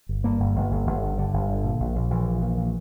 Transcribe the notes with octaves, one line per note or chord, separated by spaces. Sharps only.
G1
G2 A#3
G1
G1
G1
G1
D3
G2 D3
G1
D3
A#2
A#1
A#1
A#1 E3
A#2
A#1
A#2